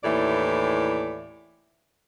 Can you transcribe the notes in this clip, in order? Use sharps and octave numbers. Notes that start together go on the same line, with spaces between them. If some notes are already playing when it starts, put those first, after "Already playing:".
D#2 A2 E3 D5